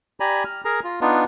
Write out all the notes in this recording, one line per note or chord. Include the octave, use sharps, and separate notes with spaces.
G4 D5 G#5 A#5 B5
F6
G#4 A#4 A#5
F4
B3 D4 D#4 F4